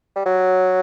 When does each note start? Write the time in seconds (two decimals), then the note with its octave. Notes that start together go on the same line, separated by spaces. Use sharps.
0.16 G3
0.26 F#3